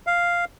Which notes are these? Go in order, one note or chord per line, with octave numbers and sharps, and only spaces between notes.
F5